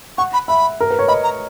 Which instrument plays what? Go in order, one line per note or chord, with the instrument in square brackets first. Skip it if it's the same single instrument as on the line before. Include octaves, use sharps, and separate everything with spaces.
[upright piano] F#5 [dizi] C#6
[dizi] B5
[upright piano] E5 [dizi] B5
[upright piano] A#4
B4
C#5
[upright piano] D#5 [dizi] B5
[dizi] A#5